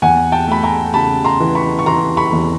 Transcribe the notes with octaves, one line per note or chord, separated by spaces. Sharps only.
E2 F#5 G#5
G5 A5
A3 B5
G#5 A#5
C#3 A5 B5
A#5 C6
E3
B5 C#6
C#6
E3 A#5 C6
B5 C#6
E2